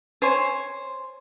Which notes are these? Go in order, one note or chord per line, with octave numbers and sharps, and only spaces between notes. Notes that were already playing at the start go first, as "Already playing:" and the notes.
C5 C#5 G#5